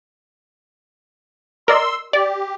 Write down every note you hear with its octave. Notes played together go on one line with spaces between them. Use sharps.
A#4 D5 D#5 C6 E6
G4 D5